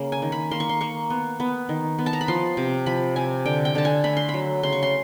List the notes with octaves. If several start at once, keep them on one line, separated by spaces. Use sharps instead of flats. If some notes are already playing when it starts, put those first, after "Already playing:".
Already playing: C#3 A#3
G#5
D#3
B5
A#3 C6
C#6
C6
A#3 C#6
B3
B3
D#3
B3
A5
A#5
B5
F3 C6
C3
F3 B5
C3 G#5
D3 G5
G5
D3 A5
G#5
A3 B5
C6
B5
F#3
C#3 C6
C#6
C6